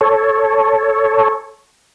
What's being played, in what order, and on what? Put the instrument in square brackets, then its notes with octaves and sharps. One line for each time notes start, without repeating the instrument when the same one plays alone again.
[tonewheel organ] A4 C#5